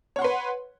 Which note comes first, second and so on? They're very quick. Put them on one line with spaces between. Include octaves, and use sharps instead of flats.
C#5 F#5 C6 B4